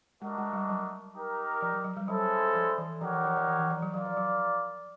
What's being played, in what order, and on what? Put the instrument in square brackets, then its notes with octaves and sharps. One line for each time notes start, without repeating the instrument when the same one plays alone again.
[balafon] G#3 [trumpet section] A3 D4 F#4 A#4 D#5
[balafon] G#3
G3
F#3
[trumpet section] D#4 G4 A#4
[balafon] F3
F#3
F#3
G3
[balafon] F#3 [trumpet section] G#3 C#4 E4 A4 C5
[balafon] F3
E3
[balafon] F3 [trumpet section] D#4 G4 A#4 C#5 F#5
[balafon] E3
F3
F3
E3
E3
F3
F#3
[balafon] F#3 [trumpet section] F4 A#4 D5
[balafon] F3
F#3